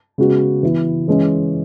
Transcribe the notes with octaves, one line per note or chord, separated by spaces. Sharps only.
C#3 G#3 B3 F#4
E3 B3 E4 B4
E3 G#3 C#4